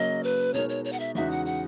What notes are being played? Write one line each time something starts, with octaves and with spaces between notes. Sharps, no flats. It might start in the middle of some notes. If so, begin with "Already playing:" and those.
Already playing: C#3 F#3 A#3 D#5
B4
B2 G#3 D#4 A#4 C#5
C#5
C#5
F#5
E5
E2 C#3 G#3 D#4 F#4 E5
F#5
F#5